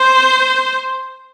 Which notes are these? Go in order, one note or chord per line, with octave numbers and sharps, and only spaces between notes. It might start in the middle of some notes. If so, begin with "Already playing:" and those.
Already playing: C5